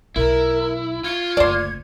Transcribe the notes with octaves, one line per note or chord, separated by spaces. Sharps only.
B1 E4 A#4
F4 G#6
F#1 D2 C5 D5